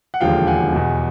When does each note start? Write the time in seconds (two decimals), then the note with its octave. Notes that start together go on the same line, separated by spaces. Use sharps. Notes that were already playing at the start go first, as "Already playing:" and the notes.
0.14 F#5
0.20 E1 D#2 D3 F3 F5 G5
0.47 F#5 G#5
0.72 E2 B2